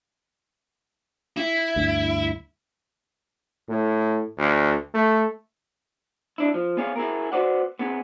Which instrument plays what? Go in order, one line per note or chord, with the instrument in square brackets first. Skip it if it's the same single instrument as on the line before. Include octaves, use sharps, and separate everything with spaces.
[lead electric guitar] E4
[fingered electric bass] D2 G2
[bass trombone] A2
D2
A3
[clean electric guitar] D4 E4
F3
B3 G#4 C#5 F5
E4 G#4 A#4
F#4 B4 C5 D5 F#5
B3 C4 G#4